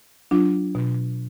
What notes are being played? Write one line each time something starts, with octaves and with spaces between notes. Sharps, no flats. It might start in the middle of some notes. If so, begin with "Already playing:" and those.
F#3 D4 F4
B2